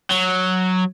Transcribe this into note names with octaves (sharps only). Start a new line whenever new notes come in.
F#3